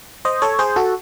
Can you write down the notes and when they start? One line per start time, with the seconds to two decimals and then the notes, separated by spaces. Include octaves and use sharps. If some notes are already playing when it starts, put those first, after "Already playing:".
0.25 C5 D#5
0.42 A4 C#5
0.59 G#4 C5
0.76 F#4 A4